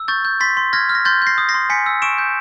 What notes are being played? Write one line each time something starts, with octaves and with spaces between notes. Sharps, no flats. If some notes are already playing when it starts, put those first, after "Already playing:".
Already playing: E6
C#6 G6 A6
G6
C6 A6 B6
C6
F6 G#6 A#6
F6
A#6
C6 G6 A6
G6 A#6 C7
D#6
A#6 C7
C6
G#5 B6 C#7
E6
C#6 D7 E7
G6